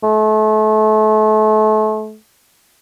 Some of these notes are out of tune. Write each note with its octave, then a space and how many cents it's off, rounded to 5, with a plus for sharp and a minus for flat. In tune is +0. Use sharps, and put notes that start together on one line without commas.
A3 -30